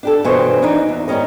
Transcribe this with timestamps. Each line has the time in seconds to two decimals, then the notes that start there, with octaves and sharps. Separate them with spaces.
0.03 D4 G4 A4
0.24 G2 B2 E3 C5 C#5 G#5
0.62 E3 D4 D#4
0.89 E2
1.08 G#2 D#3 G3 C#4 D#5